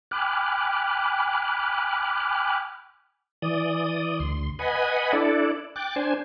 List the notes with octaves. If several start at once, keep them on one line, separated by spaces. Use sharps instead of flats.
G5 G#5 B5 D6 F6 F#6
E3 D5 D#6
D2 C6
B4 D#5 F#5 G#5 B5
D4 E4 A4 D5
G5 D6 F#6 A6
D4 C5 G#5